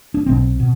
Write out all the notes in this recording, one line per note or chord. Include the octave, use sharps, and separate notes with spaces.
D4
B1 B2 C4
B2